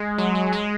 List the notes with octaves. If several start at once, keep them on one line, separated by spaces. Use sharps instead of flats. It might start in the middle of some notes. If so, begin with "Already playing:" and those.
Already playing: G#3
F#3
F#3
G#3